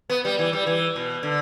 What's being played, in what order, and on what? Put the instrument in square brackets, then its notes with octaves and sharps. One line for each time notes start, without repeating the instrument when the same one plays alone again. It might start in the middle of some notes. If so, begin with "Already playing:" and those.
[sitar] B3
G3
E3
G3
E3
B2
D3